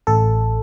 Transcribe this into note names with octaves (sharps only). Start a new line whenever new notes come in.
A1 A4